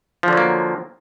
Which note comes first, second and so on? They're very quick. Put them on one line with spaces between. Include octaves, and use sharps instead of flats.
F3 D3 F#3 A#3